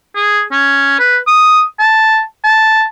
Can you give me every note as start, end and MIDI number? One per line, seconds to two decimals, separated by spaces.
0.15 0.42 68
0.52 0.98 61
0.99 1.18 71
1.27 1.63 87
1.79 2.21 81
2.44 2.84 81